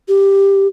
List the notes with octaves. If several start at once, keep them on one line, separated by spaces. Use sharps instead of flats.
G4